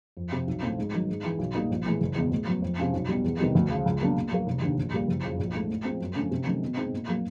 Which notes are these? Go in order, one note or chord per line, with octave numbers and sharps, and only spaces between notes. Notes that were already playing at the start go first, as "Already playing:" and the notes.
F2
C3 F3
B1
A2 F3 A3 C4
G#2
D#3 F#3
G#2
E3 G#3
B1
A#2 G3 A#3 D#4
A#1
A2 E3 G#3
F#1
E2 B2 G#3
A2
F#3 B3
F2
C3 F3 G#3 C#4
B1
B2 G3
E2
C3 D#3 G3 B3
D2
C#3 F3
C#2
B2 F#3 A#3 D4
A#2
F#3 A#3
F1
D#2 D3
A#1
A#2 G3 A#3
F#1
F2 C#3 F3
A#1
G#2 F3 A3
A2
F3 G#3 C4 F4
F#2
D3 F3 A3 C#4
C3
D#3 F#3 A3 C#4
B2
G#3 C4 D#4
A#2
F#3 A#3